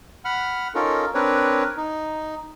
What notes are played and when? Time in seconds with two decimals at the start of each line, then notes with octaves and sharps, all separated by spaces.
0.25 F#5 B5 F6
0.75 C#4 D#4 F4 A4 A#4
1.14 C4 D4 A#4 B4 C#5
1.77 D#4